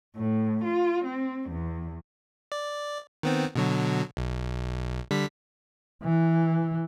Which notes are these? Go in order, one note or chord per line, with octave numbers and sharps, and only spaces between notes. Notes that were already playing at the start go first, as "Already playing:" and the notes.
A2
F4
C4
E2
D5
D#3 B3 C4
B2 D3 F#3
B1
D3 G3 B6
E3